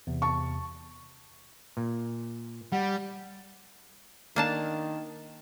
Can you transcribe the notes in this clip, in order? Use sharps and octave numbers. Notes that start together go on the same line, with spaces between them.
E2 C3
A5 C#6
A#2
G3 F#5
D#3 A#3 D4 A5